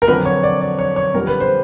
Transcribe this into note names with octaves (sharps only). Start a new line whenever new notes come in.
A#4
F2 D3 F#3 B4
C#5
D5
D5
C#5
C#5
F2 D3 G3 A#4
B4
C5